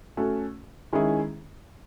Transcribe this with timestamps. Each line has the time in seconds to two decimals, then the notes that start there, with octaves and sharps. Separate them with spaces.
0.17 A3 C#4 F#4
0.93 D#3 G#3 C#4 E4 G#4